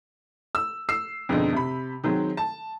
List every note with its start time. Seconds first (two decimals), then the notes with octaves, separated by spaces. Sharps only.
0.55 E6
0.89 E6 C7
1.29 F2 G#2 B2 D3 D4 D#4
1.53 C3 B5
2.04 D#3 F#3 G#3 C4
2.37 A5